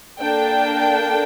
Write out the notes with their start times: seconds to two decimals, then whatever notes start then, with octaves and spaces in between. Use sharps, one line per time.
0.20 A#3 D4 A4 G5